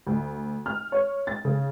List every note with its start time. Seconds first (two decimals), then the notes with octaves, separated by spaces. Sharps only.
0.07 D2
0.66 F6
0.92 C#5
1.27 A6
1.45 C#3